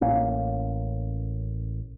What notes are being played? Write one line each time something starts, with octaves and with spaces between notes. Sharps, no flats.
A1 A#3 C#4